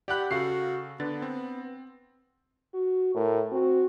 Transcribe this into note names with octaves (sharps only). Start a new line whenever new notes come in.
G4 D5 F#5 B5 F#6
C#3 F#4 A4 F5 C7
D3 B3 D4 A6
C4
F#4
A2 A#4
C4 F#4